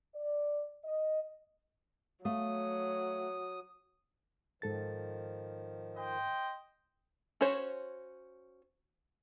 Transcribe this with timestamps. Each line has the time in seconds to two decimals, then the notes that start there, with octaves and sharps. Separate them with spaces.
0.15 D5
0.84 D#5
2.25 F#3 A3 F5 D#6
4.62 G#2 D#3 F3 A4 A6
5.96 C5 D#5 G5
7.41 C#4 F#4 C5 C#5